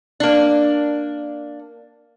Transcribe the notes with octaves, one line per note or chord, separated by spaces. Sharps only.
A#3 D4